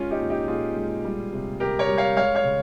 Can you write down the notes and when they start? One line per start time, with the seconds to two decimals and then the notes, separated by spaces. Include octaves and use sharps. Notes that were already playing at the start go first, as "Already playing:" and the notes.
Already playing: G#3 C#4 F4
0.11 D#4 G4
0.20 A#2
0.30 D#4 G4
0.48 A#2 F4 G#4
0.76 G#3
1.04 G3
1.32 C3
1.60 C3 G4 A#4
1.79 A#4 C#5
1.88 G3
1.98 C#5 F5
2.17 G#3 C#5 F5
2.35 C#5 F5
2.44 C#3